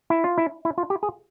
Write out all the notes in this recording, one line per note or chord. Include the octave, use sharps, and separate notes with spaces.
E4
F4
E4
E4
F4
G4
G#4